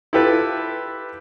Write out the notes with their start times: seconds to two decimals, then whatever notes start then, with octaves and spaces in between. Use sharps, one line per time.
0.13 E4 F4 G4 A4 B4